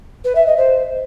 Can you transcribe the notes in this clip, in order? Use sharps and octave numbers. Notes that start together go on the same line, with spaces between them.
B4
E5
D#5
C5